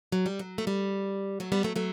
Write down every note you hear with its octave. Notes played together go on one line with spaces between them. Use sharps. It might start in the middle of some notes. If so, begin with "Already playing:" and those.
F#3
G3
F#3
A3
G3
F#3 A3
G3 B3
F#3 A3
F#3 A3